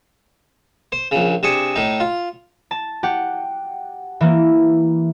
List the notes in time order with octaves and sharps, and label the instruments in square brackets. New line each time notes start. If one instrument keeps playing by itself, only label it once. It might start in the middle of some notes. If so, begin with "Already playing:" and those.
[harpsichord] C5
A#1 C#3
C3 D4 G#4 C#6
A2 D#4
F4
[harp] A5
G4 F#5
E3 A#3